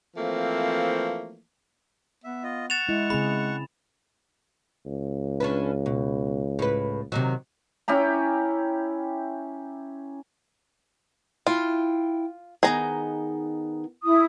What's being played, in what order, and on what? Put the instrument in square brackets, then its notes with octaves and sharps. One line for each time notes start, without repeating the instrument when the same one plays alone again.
[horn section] E3 F3 A3 A#3 C4
[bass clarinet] B3 [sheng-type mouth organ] E5
[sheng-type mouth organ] F4 D#5
[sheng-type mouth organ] F#5 C#6 [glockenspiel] A6 E7 F7
[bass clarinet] G#3 [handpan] E4
[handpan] C#3 C4 G#4 [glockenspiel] B5
[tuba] C#2
[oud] C#4 D4 B4
B2
A2 B4
C3 D#3 F#3
[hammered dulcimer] C#4 E4 G4 A#5
[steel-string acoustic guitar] E4 G5 [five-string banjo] F4
[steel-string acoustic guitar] D#3 B3 D#4 [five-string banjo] G#4 A#5
[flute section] E4 D#6